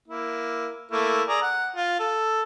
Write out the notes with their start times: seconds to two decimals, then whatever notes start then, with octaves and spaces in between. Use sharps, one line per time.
0.08 A#3 E4
0.91 A3 A#3 E4
1.28 G#4 D5 A#5
1.43 F#5
1.76 F4
1.99 A4